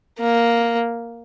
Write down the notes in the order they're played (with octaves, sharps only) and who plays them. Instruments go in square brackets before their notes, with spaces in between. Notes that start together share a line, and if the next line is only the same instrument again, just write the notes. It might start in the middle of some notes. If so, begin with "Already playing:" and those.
[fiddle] A#3